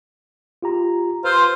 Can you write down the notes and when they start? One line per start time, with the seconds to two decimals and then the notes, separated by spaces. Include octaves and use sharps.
0.63 F4 G4 A#5
1.24 F4 B4 C5 E6